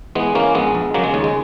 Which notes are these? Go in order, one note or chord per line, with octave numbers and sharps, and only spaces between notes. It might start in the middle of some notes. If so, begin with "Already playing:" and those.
E3 G#3 B3
E3 A#3 C#4
A#1 G#3 B3
A#1
C#3 F#3 A#3
G#3
D#2 G#3
G#3